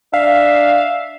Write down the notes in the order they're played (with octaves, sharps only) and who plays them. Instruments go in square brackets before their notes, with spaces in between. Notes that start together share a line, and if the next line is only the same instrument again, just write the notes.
[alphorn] D4 [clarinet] E5 [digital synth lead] F5